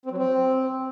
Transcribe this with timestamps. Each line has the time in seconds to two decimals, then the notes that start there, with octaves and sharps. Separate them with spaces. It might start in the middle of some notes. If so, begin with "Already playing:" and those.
0.05 C4
0.12 F#3
0.18 C4